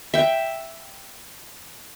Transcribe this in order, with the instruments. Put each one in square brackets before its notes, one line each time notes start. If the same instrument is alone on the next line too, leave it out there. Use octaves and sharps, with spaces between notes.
[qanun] E5 G5